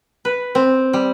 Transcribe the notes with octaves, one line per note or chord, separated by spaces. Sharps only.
B4
C4
G3